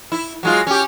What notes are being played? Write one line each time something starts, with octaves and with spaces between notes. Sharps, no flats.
E4
F#3 G#3 F4
C#4 G4